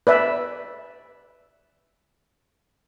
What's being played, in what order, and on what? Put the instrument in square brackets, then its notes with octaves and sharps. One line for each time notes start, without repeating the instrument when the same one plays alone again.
[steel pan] B4 D5 E5